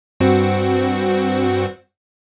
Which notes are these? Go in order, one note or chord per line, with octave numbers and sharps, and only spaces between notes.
G2 C4 F#4